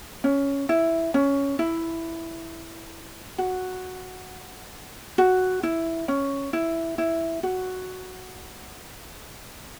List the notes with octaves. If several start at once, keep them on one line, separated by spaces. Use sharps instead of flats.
C#4
E4
C#4
E4
F#4
F#4
E4
C#4
E4
E4
F#4